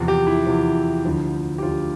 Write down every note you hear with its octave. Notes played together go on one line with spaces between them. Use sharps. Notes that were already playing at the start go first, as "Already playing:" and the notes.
Already playing: E2 C3 F3
G4
E4
E2 C3 F3
D2 D3 F3
G4
D2 D3 F3 F4